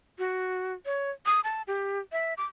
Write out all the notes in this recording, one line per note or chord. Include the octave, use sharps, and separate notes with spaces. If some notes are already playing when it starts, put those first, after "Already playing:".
F#4
C#5
D#6
A5
G4
E5
D6